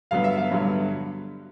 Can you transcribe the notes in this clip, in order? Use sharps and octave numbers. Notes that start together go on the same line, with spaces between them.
G2 D3 F#3 B3 F5
E5
F5
G2 D3 F#3 B3